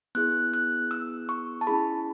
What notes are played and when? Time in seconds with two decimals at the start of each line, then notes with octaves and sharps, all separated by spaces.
0.15 B3 E4 G#4 F#6
0.54 F#6
0.91 E6
1.29 C#6
1.61 A5
1.67 C#4 E4 G#4 B5